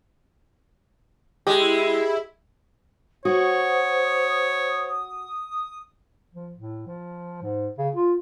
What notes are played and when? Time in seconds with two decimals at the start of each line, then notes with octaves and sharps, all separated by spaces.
1.47 G#3 E4 G4 D#5
3.25 F#4 C5 C#5 D#6
6.33 F3
6.55 A2
6.87 F3
7.42 G#2
7.78 C#3
7.95 F4